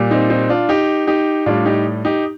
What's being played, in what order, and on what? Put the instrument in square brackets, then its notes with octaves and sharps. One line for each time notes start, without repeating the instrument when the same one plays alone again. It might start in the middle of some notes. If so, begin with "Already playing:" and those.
Already playing: [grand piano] A#2 G3
C4 D#4
C4 D#4
D4 F4
D#4 G4
D#4 G4
A2 G3 D4 F4
D#4 G4
D#4 G4